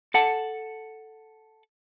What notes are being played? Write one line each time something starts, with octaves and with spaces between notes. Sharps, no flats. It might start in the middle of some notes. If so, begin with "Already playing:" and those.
A4 F#5 A5